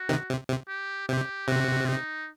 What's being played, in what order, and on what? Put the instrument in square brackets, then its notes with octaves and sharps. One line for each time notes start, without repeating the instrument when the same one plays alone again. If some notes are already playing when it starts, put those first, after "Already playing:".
Already playing: [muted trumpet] F#4
[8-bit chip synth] C3 D#3
C3
C3
[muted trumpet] G4
[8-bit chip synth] C3 [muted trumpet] G4
[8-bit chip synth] C3 [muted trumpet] F#4
[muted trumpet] D#4